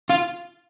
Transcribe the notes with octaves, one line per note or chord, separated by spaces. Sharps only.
F4